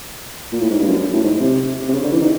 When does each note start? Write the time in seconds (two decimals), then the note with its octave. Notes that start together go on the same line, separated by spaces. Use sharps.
0.52 A#2
0.61 A2
0.70 G#2
0.79 G2
0.87 F#2
1.13 A2
1.23 G#2
1.40 C3
1.88 C3
1.94 C#3
2.03 D3
2.12 E3
2.21 D#3